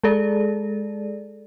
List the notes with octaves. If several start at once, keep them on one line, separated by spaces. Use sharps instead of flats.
G#3 G#4 A4 D5